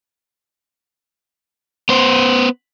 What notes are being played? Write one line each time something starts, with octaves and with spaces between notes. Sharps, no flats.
B3 C5